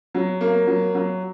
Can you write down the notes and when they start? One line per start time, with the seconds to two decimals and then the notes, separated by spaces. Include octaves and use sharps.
0.14 F#3
0.41 A#3
0.67 F#3
0.95 F#3